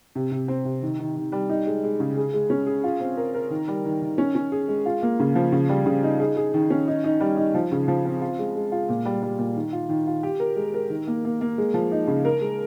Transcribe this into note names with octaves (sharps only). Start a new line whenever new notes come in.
C3
C3
C4
C3
D#3
D#3
D#3
G3
D#4
G#3
G#3
C#3
G#4
G#3
C#4
G#4
F4
C4
A#4
A#4
D#3
G3
D#3
D#3
C#4
C#4
G#4
G#3
F4
A#3
C#3
F3
C#3
G3
C#3
D#4
G#4
G#4
D#3
C#4
D#4
D#4
G3
D#4
F3
C#3
F3
C4
F4
G#3
G#3
F4
A#2
G3
G3
A#2
D#3
F4
D#3
F4
G4
A#4
G#3
A#4
D#3
A#3
A#3
A#3
G#3
F3
D#4
C#3
A#4
G#3